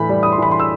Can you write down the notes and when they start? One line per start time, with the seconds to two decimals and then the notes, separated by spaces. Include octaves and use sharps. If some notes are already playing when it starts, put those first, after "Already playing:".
Already playing: A2 E3 B5
0.09 G3
0.23 D#6
0.32 C6
0.38 E3 B5
0.51 C6
0.60 E6